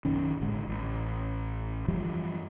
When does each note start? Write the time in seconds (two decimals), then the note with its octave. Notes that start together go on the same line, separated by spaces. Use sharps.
0.05 A#1 F#2 D#3 C#4
0.41 G#1 A2 D3 G#3
0.67 A1
1.88 F#2 E3 F3 G3